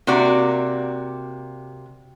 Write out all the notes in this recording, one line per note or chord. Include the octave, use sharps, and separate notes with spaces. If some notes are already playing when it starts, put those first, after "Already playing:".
C3 A#3 F#4 D5